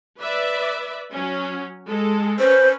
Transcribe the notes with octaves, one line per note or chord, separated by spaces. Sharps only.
B4 D5 E5
F#3 C#4
G#3 A4
C#4 B4 C5